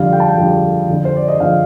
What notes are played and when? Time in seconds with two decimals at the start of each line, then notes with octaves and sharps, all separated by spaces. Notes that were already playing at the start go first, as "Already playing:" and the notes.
Already playing: F2 D3 G3 F5
0.12 G5
0.20 A5
0.29 G5
0.38 F2 D3 G3
0.88 F2 D3 F3
1.05 C5
1.16 D5
1.28 D#5
1.39 F2 D3 F3 F5